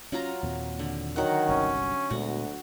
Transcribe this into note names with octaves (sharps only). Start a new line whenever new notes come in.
F#3 C#4 F4 A#5
D#2 A#2 C4
D3
D#3 F#3 F#5
G1 C2 C#4
D2 A#2 G#3 B3 F#4